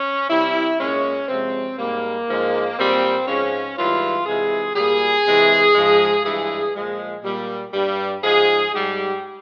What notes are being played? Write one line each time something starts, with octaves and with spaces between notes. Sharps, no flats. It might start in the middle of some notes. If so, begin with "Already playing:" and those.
Already playing: C#4
C3 G3 E4
A#2 G#3 C#4
C3 F3 G#3 C4
G#2 G3 A#3
G#2 F3 G#3
A#2 G3 C4
G#2 F3 G#3 C#4
G#2 E3 G3 F4
C3 E3 G#3 G#4
A#2 G3 G#4
C3 E3 G#3
G#2 F3 G#3
G2 E3 G#3 G#4
A#2 F3 G#3
A#2 G3
G2 G3
G#2 F3 G#3 G#4
G#2 G3 G4